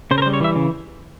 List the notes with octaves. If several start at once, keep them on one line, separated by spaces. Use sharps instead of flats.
C#3 C5
A#4
C5
G3
C#5
E3 E5
C#3